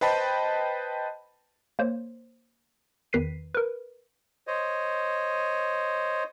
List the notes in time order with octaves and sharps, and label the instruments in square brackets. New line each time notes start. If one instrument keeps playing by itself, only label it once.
[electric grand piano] B4 C5 D#5 G5 A5 B5
[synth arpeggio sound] A#3 C5 C#5
E2 D#3 B4 B6 C7 D#7
A#4 B4
[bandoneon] C5 C#5 D#5